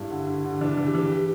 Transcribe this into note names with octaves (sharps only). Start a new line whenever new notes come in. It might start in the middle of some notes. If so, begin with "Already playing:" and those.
Already playing: G2 E4
D3
D3
D3
E3 D4
E3
G4
E3
G4